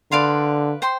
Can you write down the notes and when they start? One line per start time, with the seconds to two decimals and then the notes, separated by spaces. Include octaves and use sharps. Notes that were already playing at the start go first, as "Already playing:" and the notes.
0.11 D3 B4 D5 F5 C6
0.82 C5 G5 C6